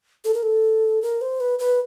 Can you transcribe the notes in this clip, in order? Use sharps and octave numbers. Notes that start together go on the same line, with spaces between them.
A4
A#4
A4
A#4
C5
B4
B4